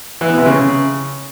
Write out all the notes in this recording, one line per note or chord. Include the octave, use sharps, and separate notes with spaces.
E3
B3
C3
C#3